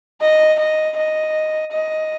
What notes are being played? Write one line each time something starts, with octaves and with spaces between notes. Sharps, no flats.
D#5
D#5
D#5
D#5